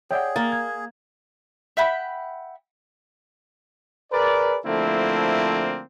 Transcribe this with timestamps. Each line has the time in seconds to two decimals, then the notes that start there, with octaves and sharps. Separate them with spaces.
0.11 G#4 C#5 D5 E5 F#5 G5
0.36 A#3 A#4 A6
0.52 G#6
1.77 E5 F#5 G5 B5
4.12 G#4 A#4 B4 D5
4.66 D3 F3 A3 A#3 C4 E4